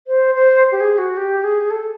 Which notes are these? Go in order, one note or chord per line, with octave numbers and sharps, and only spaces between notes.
C5
C5
G4
G#4
F#4
G4
G#4
A4